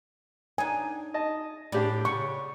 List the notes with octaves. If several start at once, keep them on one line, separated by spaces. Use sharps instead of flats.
D4 D#4 G#5
D#5 A5
A2 D4 G4 D5
C#3 C#6